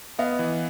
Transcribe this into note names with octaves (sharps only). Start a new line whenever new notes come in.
B3 D#5 F5
E3